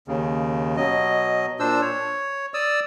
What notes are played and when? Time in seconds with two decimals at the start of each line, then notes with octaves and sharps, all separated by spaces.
0.08 D#2 C#3
0.77 B2 F#3 D#5
1.60 A#2 D4 C5 E6
1.82 C#5
2.54 D5 D#6 E6